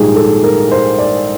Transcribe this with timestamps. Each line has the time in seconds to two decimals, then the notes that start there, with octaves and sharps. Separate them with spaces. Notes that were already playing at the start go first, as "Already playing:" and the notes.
Already playing: A#1 G#2 D#3 G3 G4 G#4
0.15 A4
0.44 A#4
0.72 C5
0.99 D5